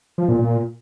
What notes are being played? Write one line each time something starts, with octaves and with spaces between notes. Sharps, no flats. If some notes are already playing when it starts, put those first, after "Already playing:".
F3
A#2
A#2